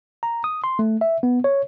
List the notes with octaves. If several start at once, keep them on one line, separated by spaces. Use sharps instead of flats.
A#5
D#6
C6
A3
E5
B3
C#5